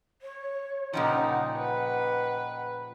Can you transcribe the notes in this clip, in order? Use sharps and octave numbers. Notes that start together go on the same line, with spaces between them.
C#5
A#2 C#3 F3 D#4 D#5 F#5 G5 A#5
B4